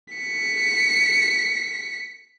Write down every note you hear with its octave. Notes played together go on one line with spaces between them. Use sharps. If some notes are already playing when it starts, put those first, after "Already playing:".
B6 C#7